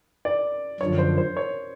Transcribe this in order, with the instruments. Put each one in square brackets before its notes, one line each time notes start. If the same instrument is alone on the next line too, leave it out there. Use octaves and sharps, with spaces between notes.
[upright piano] D5
[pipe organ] F#2 D3 F3 [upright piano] C#5
[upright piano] C5
C5
C#5